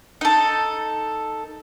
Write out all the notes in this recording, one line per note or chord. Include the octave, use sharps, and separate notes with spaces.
D#4 A4